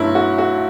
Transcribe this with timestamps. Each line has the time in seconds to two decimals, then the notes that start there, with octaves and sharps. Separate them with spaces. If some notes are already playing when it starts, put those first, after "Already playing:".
Already playing: G1 G2 F#3 A3 E4
0.15 F#4
0.38 F#4